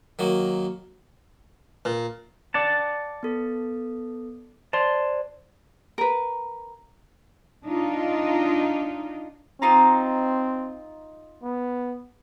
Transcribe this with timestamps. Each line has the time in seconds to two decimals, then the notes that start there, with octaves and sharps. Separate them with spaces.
0.19 D#3 F#3 A#3
1.85 A#2
2.54 D5 F#5 A5
3.23 B3 A4
4.73 C5 D5 A5 C6
5.98 A#4 B4
7.65 D4 D#4 F4
9.62 C4 D#4 F4 A#5
11.43 B3